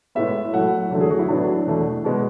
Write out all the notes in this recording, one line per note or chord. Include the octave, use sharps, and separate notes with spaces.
A2 G#3 B3 E5
A2 F#3 A3 F#5
E2 D3 F#3 A3
G#4
F#4
E4
A2 F#3 B3 D4
E2 B2 A3
B2 G#3 B3